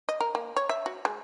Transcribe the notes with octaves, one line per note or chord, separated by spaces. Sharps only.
D#5
A#4
A#3
C#5
E5
F#4
G#3